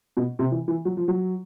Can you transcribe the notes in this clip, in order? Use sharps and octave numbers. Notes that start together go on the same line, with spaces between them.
B2
C3
E3
E3
F#3
F3
F#3